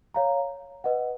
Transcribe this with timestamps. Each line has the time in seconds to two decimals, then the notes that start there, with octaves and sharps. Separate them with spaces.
0.14 C#5 F5 A#5
0.84 B4 D#5 F#5